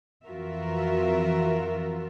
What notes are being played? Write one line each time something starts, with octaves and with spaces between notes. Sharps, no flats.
F2 E3 F4 F#4 A#4 E5